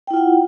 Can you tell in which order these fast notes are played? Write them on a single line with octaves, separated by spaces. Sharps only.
G5 E4 F4 F#5